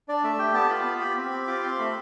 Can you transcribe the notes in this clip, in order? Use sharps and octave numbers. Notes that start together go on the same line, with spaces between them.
D4 D5
A3 E5
G4 G5
B3 A5
F4 B5
B3
G4
C4
G4
F4 D6
C4 C6
A3 B5